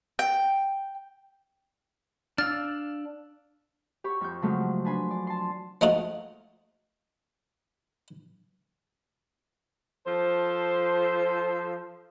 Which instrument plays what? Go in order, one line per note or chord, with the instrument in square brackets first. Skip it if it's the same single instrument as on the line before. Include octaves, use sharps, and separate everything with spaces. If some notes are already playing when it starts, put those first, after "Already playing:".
[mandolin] G5
[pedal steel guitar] D4 F5 E6 [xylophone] F6 A6
[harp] G4 C#5 B5 C#6
F2 C#6 G6
C#3 F3 F#3 G#3 A3 C4
D4 B4 G#5 B5 C6
D5
A5 C6
[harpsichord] F3 G#3 A3 D#4 F4 F#4
[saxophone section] F3 A4 C5